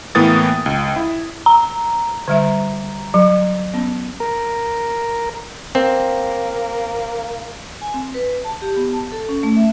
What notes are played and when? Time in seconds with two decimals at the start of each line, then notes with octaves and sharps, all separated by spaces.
0.15 A2 E3 A#3 B3 D#6 A6
0.66 C#2
0.96 E4
1.46 A#5
2.28 D3 G3 E5
3.14 F#3
3.74 B3 C#4
4.20 A#4
5.75 A#3 C4
7.81 G#5
7.94 C4
8.14 B4
8.44 A5
8.62 G4
8.76 B3
8.93 A5
9.12 A4
9.29 C#4
9.43 A3
9.56 E5